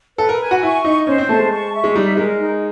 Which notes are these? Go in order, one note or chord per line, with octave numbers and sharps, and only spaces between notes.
A4 B4
A#4
G#5
F#4
E4 C#6
D#4 D#5
C#4 C5
C4
A3 A5
G#3
C#6
E5
G#3
G3 D#4
G#3 A#4
D#4